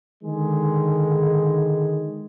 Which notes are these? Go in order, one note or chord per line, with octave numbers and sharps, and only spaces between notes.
D3 D#3 G#3